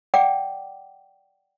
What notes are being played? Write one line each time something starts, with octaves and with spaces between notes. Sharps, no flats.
D5 F#5 G5 D6